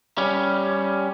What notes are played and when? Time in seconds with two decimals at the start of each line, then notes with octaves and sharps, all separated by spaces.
0.18 G3 C#4